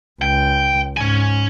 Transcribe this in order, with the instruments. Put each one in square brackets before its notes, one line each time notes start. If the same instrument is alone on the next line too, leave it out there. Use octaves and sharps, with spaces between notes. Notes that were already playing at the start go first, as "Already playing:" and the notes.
[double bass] C#2 [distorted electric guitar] G5
[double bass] G#2 [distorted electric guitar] C#4 G#5